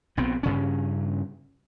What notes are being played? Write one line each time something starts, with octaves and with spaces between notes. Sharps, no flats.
A#1 B3 C4
G2 C#3 C#4